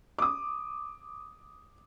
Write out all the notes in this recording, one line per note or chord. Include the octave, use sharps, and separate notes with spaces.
D6 D#6